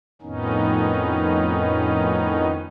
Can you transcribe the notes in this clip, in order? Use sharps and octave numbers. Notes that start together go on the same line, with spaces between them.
F2 A2 D#3 B3 C#4 D#4